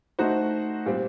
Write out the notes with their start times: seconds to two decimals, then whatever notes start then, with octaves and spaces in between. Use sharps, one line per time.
0.19 A3 D#4 F#4 C5
0.86 A#2 G3 C4